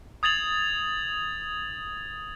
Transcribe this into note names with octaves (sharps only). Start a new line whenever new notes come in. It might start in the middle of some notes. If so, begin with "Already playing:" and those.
D#6 G#6 A6 F7 F#7